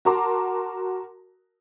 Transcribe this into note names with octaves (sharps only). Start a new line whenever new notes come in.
F#4 A#4 A5 A#5 C6 D6